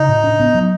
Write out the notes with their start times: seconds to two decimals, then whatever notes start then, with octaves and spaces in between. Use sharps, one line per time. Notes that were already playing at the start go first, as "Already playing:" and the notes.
Already playing: C#3 D#4
0.08 A2
0.24 D4
0.40 B3
0.54 F#3